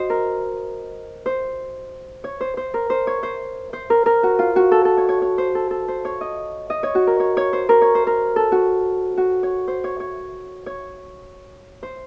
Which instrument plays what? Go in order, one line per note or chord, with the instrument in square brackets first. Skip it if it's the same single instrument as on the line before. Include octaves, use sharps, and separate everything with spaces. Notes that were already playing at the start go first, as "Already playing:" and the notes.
Already playing: [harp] F#4 C5 D#5
A#4
C5
C#5
C5
C5
A#4
C5
C#5
C5
C5
A#4
A#4
F#4
F4
F#4
A4
A4
C#5
C#5
C#5
C5
A4
A4
C5
C#5
D#5
D#5
C#5
F#4
A#4
C#5
C#5
C5
A#4
C#5
C5
A#4
A4
F#4
F#4
C#5
C5
C#5
C#5
C#5
C5